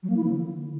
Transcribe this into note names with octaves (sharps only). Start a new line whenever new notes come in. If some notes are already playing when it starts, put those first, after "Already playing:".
F#3
A#3
E4
F3
D3